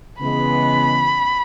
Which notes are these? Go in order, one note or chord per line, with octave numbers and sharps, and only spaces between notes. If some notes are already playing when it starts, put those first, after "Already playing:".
C#3 E3 G#3 B3 B5